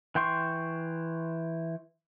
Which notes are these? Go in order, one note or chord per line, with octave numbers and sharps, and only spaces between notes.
E3 G5 C6 C#6